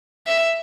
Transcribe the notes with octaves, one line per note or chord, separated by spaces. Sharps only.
E5